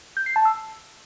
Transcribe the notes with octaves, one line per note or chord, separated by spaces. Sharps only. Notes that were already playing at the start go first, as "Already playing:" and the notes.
G6
C7
A5
E6